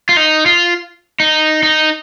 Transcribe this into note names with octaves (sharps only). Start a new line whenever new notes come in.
F4
D#4
F4
D#4
D#4